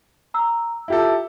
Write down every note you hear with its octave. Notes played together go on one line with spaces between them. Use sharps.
A#5 E6
E4 F4 G4 A4